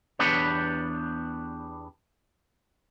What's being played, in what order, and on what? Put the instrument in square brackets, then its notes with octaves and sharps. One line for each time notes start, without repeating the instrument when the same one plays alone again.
[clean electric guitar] E2 B3 D4 G4 B4 C#5